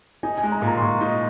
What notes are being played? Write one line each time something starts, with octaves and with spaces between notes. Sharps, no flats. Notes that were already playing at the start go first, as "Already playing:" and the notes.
D#4 G#5
G#5
G#3
A#5
A#2
A#5
C6
A#2 C#6
D#4